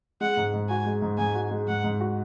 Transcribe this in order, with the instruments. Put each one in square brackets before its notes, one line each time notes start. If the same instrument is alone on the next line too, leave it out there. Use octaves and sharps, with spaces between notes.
[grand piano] G#3 [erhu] F#5
[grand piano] G#2
G#2
[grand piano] F#4 [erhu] G#5
[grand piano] G#3
G#2
[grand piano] G#2 [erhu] G#5
[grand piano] F#4
G#3
[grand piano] G#2 [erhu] F#5
[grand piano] G#2
F#4